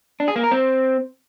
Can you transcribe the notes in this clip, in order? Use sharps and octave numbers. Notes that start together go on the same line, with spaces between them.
D4
G#4
A#3
A#4
C4